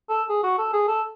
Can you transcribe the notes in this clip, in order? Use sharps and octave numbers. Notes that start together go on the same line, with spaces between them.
A4
G#4
F#4
A4
G#4
A4